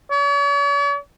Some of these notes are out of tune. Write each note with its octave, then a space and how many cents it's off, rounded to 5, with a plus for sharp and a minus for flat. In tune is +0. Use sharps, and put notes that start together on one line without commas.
C#5 +45